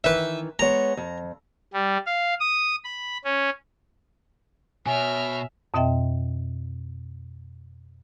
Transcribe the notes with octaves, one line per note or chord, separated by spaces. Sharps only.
D#3 E3 B4 E5
G#3 B3 C#5 A#5
F2
G3
F5
D#6
B5
C#4
B2 C#5 E5 G#5 F6
F2 B2 C4 D#5 E5 G5